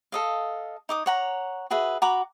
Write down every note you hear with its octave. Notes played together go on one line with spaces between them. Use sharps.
A4 D#5 F5
D#4 D6 D#6
C#5 F#5 A#5
F#4 G#4 B4 E5
F#4 A#5 B5 D6